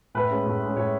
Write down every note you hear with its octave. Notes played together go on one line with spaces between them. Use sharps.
A2 B4
G#3 C#4
A2
G#3 C#4
A2 C#5